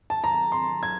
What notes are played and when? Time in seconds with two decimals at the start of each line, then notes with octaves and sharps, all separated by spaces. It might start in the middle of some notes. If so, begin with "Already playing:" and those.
0.10 A5
0.24 A#5
0.52 C6
0.83 G#6